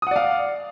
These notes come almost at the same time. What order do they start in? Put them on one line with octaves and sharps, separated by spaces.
D#6 F#5 D5 F5